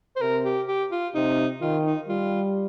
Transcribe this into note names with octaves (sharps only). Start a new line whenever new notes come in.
C5
C3 A#4
G4
G4
F4
C3 D#4
D#3 F4
D#4
G3 F4